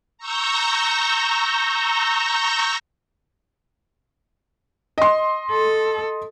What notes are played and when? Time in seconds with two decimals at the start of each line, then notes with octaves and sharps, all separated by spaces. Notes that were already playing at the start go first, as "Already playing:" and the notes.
0.18 A#5 C#6 E6 G6 A#6
4.98 D#5 C6
5.51 A4